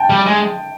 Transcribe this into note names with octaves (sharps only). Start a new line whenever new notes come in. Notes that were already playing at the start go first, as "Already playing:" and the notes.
Already playing: G5 A5
G3
G#3